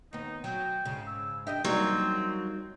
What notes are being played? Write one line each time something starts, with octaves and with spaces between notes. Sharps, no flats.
D#2 B3 D#4
F#3 G5
G#2 C#3
E6
D4 G4 D#5 E5 G5
E2 F#3 G3 A#3 C4 D4 D#4 G#6